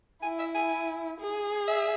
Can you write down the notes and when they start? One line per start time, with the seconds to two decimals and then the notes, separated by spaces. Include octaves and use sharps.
0.23 E4 G#5
0.39 E5
0.55 G#5
1.20 G#4
1.68 E5